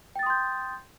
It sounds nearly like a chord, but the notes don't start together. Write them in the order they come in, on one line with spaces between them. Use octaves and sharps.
G5 A6 D#6 C6 G6